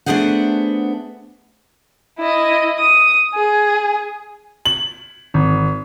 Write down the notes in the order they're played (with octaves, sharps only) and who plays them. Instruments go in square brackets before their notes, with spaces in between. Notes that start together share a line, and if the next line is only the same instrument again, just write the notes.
[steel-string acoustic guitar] A3 B3 D4 G#4 C5 F#5
[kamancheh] E4 D#5
D#6
G#4
[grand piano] F#7
G#1